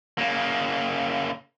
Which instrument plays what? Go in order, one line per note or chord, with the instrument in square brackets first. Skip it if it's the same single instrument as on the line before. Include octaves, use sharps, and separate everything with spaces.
[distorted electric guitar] C#3 A#3